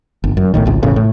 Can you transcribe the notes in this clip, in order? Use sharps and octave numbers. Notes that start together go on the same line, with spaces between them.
G1
F#2
B1 A2 D#3
G#1 C#2
E1 A1 A2 C#3
A2